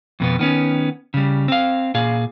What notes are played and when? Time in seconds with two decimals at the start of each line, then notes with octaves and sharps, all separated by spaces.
0.20 F2 B2 B3
0.39 D#3 B3 C#4
1.14 C#3 G3
1.48 C4 F5
1.94 A#2 G#4 F5